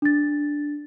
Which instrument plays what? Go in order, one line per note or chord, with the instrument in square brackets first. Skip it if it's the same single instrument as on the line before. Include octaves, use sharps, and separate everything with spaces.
[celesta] D4 A6